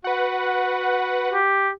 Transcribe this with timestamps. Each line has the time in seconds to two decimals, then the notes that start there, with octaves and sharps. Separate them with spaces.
0.04 F#4 B4 F#5
1.32 G4